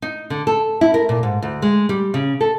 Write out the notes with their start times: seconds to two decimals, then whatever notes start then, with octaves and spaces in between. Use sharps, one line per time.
0.02 D#4
0.30 D3
0.47 A4
0.81 E4
0.94 A#4
1.09 A#2
1.23 G#2
1.42 D2
1.62 G#3
1.89 G3
2.14 C#3
2.41 A4